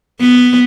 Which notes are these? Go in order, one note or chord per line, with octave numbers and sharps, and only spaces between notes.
B3